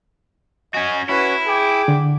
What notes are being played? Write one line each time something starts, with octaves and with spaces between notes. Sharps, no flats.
C#4 F#4 D#5 G#5
C#4 E4 F#4 B4
G#4 G5 D6
D3